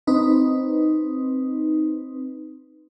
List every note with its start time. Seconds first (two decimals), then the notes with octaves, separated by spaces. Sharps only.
0.07 C4 D#4 B4